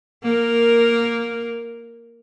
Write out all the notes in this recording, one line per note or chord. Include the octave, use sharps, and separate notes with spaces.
A#3 A#4